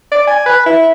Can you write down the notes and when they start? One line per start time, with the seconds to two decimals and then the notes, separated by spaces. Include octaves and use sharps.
0.12 D5
0.27 G#5
0.46 B4
0.66 E4